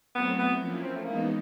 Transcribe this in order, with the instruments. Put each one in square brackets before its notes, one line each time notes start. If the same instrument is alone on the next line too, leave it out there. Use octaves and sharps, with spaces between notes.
[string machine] F#3 A3 C4 E4 [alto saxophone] B3
[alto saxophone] B3
[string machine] F3 A#3 C#4 E4
[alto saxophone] C4
A3
[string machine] E3 G#3 B3 D#4 [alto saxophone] A#3